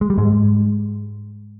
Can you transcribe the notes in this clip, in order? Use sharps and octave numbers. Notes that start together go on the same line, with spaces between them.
G#3
G3
G#2 G#3